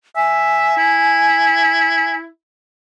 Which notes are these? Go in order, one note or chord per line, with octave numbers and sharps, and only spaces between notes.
E5 G#5
E4